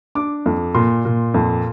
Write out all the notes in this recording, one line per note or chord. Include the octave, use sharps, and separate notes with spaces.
D4 D6
F2
A#2 C6
A#2
F2